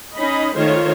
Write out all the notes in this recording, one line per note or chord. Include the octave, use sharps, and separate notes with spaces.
C#4 D#4 D#5 B5
D#3 A3 F4 C5 C#5